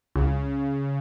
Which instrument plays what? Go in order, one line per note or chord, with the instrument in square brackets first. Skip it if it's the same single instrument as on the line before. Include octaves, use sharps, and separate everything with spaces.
[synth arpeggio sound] C#2 [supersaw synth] C#3